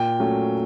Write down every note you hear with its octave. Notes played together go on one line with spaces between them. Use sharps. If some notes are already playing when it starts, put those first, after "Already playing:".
Already playing: A#2 G5
F#3 A3 C#4